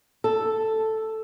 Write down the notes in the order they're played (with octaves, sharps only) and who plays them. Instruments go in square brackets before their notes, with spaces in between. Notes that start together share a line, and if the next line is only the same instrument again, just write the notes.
[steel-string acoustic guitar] A4